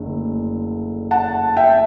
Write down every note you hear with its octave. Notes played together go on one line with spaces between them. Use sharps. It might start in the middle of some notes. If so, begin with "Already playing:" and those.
Already playing: F#1 D3 A3
F#5 A5
E5 G5